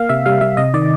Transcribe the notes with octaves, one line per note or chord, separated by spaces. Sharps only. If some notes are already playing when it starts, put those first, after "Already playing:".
Already playing: A#3 F5
C3 E5
G3 F5
G3 E5
C3 D#5
D#3 D5